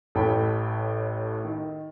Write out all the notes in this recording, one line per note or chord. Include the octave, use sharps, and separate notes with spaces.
A1 A2 A4 G5 B5
D#3